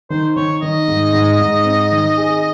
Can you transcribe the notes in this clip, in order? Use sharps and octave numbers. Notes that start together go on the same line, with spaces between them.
D#3 C5
D#3 C#5
D#3 D#5
G#2
G#2
G#2
C4
D#3
G#4